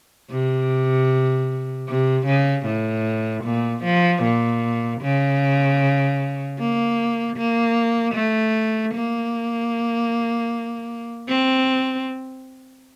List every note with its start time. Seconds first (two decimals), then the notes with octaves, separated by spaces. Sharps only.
0.31 C3
1.88 C3
2.26 C#3
2.66 A2
3.44 A#2
3.84 F3
4.23 A#2
5.01 C#3
6.59 A#3
7.36 A#3
8.15 A3
8.94 A#3
11.29 C4